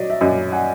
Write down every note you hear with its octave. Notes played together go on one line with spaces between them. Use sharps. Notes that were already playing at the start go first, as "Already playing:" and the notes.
Already playing: F#3 D5 D#5
E5
F#2 D#5
F#5 G#5